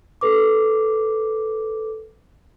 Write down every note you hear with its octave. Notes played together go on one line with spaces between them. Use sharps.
A4 B4 D6